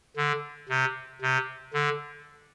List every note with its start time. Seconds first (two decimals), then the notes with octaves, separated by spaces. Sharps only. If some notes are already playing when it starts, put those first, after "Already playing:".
0.17 D3
0.69 C3
1.22 C3
1.74 D3